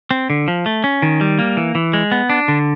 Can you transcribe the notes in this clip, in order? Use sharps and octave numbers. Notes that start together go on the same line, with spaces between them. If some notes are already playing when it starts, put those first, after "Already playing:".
C4
D3
F3
A3
C#4
D#3
G3
A#3
E3
E3
G#3
B3
D4
D3